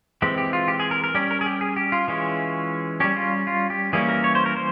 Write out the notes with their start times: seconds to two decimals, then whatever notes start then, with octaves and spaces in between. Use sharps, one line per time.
0.22 E3 G#3 C4 G4
0.38 G4
0.53 F4
0.68 G4
0.80 G#4
0.91 A#4
1.04 A#4
1.15 G3 C#4 G4
1.31 A#4
1.41 G#4
1.46 G4
1.61 G#4
1.76 G4
1.92 F4
2.08 E3 G#3 C#4
3.00 G3 C#4 G4
3.16 F4
3.47 F4
3.70 G4
3.93 E3 G3 A#3 C#4 G#4
4.09 A#4
4.24 C#5
4.35 C5
4.46 A#4
4.57 C5